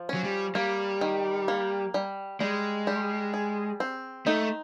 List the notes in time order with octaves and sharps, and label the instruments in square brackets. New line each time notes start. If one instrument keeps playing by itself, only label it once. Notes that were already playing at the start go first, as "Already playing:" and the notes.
Already playing: [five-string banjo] F3
C#4
[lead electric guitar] F#3
G3
[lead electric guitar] G3 [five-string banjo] A#3
[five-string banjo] D#3
A#3
G3
[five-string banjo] G3 [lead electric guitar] G#3
[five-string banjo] G3
G#4
C4
[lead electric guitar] A3 [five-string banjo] D#4